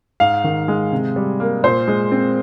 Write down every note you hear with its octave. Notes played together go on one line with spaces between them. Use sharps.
G#2 F5
D#3
G#3
C3
G3
A#3
A#2 C5
G#3
C4